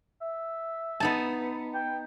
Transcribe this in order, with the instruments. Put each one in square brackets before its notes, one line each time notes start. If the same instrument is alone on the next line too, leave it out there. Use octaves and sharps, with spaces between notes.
[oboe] E5
[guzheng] B3 D#4 A5
[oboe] G5